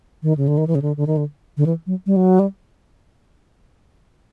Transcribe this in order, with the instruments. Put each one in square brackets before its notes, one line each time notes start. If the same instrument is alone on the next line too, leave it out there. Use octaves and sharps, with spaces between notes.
[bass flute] D#3
C#3
D3
D#3
E3
C#3
D3
D3
D#3
D3
D3
E3
F#3
G3
F#3
G3